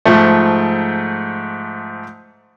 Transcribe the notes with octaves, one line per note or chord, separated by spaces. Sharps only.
G#2 F3 A3